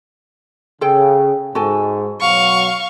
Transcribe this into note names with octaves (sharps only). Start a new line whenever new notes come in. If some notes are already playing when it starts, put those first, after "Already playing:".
C#3 G#4 A4 G5
G#2 F#4 A4 G#5
B2 F#3 F5 C#6